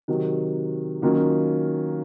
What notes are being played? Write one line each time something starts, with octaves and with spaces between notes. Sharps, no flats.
C3 D#3 F#3
D#3 F#3 A#3 C#4 F4